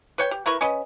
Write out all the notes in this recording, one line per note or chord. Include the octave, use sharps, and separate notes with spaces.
B4 C#5 G5
G4
E4 A#4 B4 C#6
C#4 B4 D#5